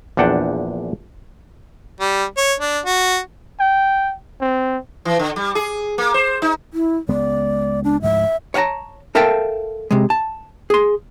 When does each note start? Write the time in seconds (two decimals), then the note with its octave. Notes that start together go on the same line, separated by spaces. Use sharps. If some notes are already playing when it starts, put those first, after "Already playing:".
0.17 A#1 E2 D4 F#5 G5 A5
2.00 G3
2.37 C#5
2.60 D4
2.86 F#4
3.60 G5
4.41 C4
5.05 E3
5.19 D3
5.36 G3
5.55 G#4
5.98 A#3
6.14 C5
6.42 D#4
6.74 E4
7.08 C#2 G#3 B3 D5
7.84 D4
8.02 D2 G#2 F3 E5
8.54 C#5 F5 F#5 A5 A#5
9.15 A4 A#4 E5 F5 G5 A5
9.91 C3 G#3
10.10 A5
10.70 G#4 C6